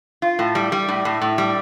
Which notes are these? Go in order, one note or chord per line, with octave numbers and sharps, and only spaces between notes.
F4
A2
G3
G3
A2
A2
A2
G3